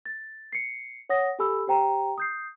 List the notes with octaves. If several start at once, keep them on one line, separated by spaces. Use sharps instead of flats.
A6
C7 C#7
C#5 F#5 D#6 A#6
G4 A4 G#5 B5 E6
G4 C5 G5 A#5
D#6 G6 C7